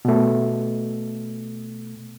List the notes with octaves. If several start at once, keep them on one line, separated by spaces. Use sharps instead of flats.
B2 A3